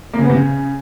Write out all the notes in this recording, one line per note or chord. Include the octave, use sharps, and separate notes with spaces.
A#3
C#3
B3
C3
C#3